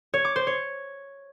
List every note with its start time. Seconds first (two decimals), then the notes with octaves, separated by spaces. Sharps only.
0.14 C#5
0.25 D6
0.36 C5
0.47 C#5